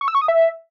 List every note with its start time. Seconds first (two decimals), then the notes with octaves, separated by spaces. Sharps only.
0.01 C#6
0.08 E6
0.15 C#6
0.22 D#6
0.28 E5